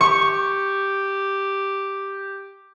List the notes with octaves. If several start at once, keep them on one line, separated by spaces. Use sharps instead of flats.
G4 C#6